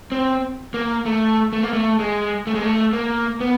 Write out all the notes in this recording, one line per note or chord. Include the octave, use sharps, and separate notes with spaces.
C4
A#3
A3
A3
A#3
A3
G#3
A3
G#3
A3
A#3
B3